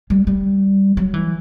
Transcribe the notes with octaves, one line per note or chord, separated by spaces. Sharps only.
G3
G3
F#3
E3